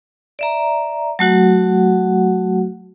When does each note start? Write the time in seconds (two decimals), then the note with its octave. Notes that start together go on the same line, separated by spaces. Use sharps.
0.39 D5 E5 A#5
1.19 F#3 A3 F#4 F#5